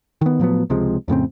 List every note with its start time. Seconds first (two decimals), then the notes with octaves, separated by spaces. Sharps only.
0.21 D#3 B3
0.40 A2 F3 F#3 B3
0.70 C#2 C3 F3 G#3
1.08 F2 A2 C#3 C4